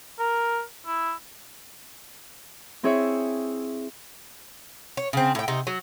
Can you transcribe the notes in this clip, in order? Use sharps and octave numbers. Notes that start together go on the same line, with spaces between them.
A#4
E4
C4 E4 G#4 C#5 E5
C#5
C#3 C4
A2 G5
C3 D#4
F#3